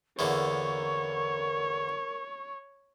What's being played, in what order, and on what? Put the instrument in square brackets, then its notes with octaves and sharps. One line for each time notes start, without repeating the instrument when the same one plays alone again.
[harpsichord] E2 D3 A#3 [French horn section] A#4 [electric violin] C#5 [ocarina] C#6